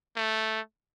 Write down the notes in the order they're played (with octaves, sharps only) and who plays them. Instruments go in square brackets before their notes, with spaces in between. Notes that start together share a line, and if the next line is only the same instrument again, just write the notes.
[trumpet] A3